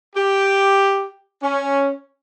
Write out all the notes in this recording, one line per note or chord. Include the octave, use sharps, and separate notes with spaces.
G4
C#4